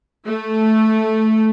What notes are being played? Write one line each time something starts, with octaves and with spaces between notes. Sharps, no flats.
A3